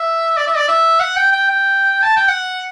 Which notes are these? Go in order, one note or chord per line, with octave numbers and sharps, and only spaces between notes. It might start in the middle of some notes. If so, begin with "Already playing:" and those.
Already playing: E5
D5
E5
D5
E5
F#5
G5
G5
G5
A5
G5
F#5